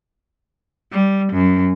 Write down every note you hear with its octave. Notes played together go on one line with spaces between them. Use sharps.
G3
F#2